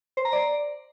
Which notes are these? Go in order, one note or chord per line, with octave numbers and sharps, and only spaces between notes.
C5
A#5
D5